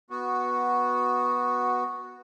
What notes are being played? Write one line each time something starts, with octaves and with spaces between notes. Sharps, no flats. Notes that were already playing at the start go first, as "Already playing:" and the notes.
B3 F#4